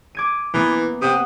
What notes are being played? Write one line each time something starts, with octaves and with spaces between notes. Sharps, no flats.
D6 G#6 D#7
E3 A#3 B3
C3 F#5 D#6